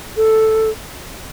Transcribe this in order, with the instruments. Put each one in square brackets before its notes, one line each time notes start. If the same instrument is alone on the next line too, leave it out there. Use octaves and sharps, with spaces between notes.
[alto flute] A4